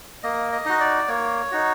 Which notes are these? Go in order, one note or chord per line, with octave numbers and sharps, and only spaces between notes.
A#3 D#5
D#5
D#4 F#4
D5
A#3 C#5
D#4 F#4